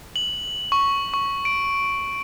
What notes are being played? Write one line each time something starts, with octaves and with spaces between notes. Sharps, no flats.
F#7
C#6
C#6
D7